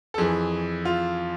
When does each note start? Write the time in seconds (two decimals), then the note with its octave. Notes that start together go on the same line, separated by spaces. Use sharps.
0.14 A4
0.18 F2 E3 G#4
0.85 F4